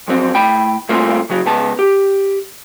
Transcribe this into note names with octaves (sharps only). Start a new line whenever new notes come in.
F2 F#3 C4
A2 G5 B5
G2 A#2 A3 C4 F4
C#3 F#3 F#4
C#2 B3 A5
G4